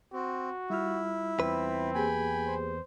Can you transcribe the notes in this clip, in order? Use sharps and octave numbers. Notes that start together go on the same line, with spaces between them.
C4 F#4
G3 E4 F4 F6
E2 C4 B4
A#3 G4 G#4 G5 G#5 B5
C5